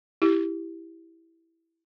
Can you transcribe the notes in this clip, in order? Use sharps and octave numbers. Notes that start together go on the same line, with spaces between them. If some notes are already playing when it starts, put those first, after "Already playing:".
E4 G4